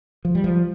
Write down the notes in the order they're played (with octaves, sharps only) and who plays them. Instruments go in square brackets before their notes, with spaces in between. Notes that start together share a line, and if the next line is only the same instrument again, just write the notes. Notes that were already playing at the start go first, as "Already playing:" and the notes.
[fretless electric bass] F3
G3
F3